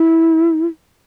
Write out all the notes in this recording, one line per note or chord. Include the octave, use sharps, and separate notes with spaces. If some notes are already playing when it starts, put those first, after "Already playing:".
Already playing: E4